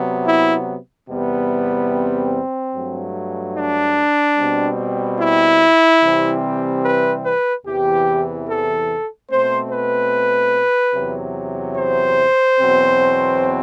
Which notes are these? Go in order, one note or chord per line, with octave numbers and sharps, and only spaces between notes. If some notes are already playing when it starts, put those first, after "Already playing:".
Already playing: C3 F#3 B3
E4
E2 C3 G3 B3
C4
G2 F#3 A3
D4
B2 G3 C4
E4
C3 E3 G3 C4
B4
B4
E2 C3 E3 G4
A4
B2 A3 C4 C5
B4
E2 C3 F#3
C5
E2 B2 F#3 C4